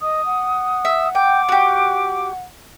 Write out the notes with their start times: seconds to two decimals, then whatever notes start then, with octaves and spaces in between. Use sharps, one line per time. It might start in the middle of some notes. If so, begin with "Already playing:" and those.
0.01 D#5 D#6
0.26 F#5
0.85 E5
1.15 G5 D6
1.49 F#4 G4